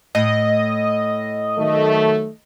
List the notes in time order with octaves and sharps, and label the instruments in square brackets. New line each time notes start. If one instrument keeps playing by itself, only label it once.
[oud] A2 [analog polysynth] D#5
[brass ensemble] D#3 F#3 A3